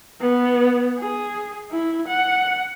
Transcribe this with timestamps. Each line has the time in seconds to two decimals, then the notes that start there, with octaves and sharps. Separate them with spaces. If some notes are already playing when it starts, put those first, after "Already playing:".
0.21 B3
0.99 G#4
1.71 E4
2.07 F#5